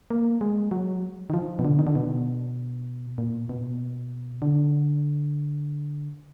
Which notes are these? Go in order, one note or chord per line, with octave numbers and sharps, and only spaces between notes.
A#3
G#3
F#3
D#3
F3
B2
D3
D#3
D3
B2
A#2
B2
D3